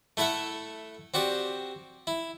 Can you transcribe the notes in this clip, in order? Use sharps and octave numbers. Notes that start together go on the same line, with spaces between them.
A3 E4 A4 E5 F#5
C4 F#4 G4 D5
E4